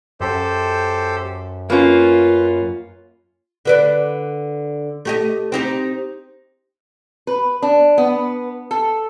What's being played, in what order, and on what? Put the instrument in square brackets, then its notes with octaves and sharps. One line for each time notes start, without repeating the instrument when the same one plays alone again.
[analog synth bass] F#2 [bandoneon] G4 A4 C5
[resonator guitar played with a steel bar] A#3 C#4 [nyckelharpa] F4 [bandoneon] B4
[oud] D3 B4 D5
A3 G4 D#5
C4 D#4 G4
[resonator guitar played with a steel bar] B4
D4
B3
A4